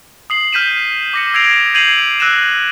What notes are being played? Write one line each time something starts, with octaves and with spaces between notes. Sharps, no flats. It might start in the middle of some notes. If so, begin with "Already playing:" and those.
D#6 C7 F#7
F6 G6 B6 D#7 E7
D6 A#6 C#7
E6 G#6 A#6 C7 D7 F7
G6 G#6 C7 D#7 F7 F#7
E6 F#6 A#6 D#7 E7